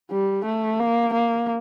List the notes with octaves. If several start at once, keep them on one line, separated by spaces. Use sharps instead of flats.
G3
A3
A#3
A#3